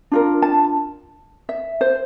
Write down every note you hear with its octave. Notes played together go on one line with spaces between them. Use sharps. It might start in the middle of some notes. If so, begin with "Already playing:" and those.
D4 F4 A#4
A5
E5
C5